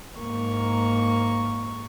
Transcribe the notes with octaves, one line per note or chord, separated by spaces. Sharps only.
G#2 A#3 A#4 C#6